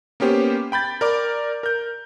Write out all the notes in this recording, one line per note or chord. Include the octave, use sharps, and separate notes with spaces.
A#3 B3 C#4 G4 C5
G5 B5 G6 A6
A#4 D5 D6
A#4 G6